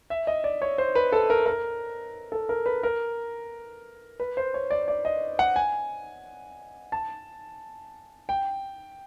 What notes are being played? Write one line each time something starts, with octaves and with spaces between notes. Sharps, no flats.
E5
D#5
D5
C#5
C5
B4
A4
A#4
A#4
A4
A#4
B4
A#4
B4
C5
C#5
D5
D5
D#5
F#5
G#5
A5
G5